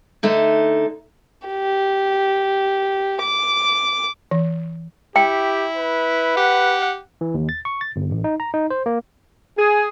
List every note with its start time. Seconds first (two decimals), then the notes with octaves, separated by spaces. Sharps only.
0.23 D3 A3 D#4
1.48 G4
3.22 D6
4.31 E3
5.16 E4 G4 G5
5.76 B4
6.37 G4 F#5
7.21 E3
7.34 D#2
7.49 A6
7.65 C#6
7.81 A6
7.96 G1
8.11 A1
8.24 D#4
8.40 A#5
8.54 D#4
8.70 C5
8.86 A#3
9.57 G#4